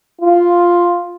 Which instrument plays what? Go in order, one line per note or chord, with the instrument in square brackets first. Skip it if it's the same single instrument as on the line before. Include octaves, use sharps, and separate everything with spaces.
[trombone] F4